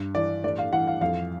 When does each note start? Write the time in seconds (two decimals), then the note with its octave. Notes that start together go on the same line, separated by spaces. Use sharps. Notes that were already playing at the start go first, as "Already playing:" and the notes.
Already playing: G2
0.15 E3 D5
0.44 A2 D5
0.58 F5
0.73 E3 F#5
0.87 F5
1.01 F2 F5